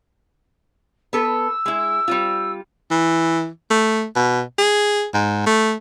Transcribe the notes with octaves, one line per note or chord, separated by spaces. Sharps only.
B3 A4 B4 E6
G#3 E4
G3 C4 F4
E3
A3
B2
G#4
G#2
A3